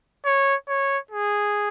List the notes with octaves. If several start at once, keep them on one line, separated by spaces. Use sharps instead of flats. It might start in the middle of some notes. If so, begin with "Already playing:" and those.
C#5
C#5
G#4